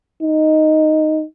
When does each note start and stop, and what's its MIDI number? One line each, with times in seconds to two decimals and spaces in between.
0.23 1.24 63